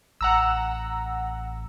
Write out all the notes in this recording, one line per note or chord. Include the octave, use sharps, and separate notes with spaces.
A1 F#5 A#5 E6